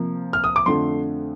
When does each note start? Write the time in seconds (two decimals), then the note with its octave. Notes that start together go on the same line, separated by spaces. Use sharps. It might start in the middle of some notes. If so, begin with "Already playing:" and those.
Already playing: C3 F3 A#3
0.33 F6
0.44 D#6
0.56 D6
0.66 F2 D3 F3 A3 C6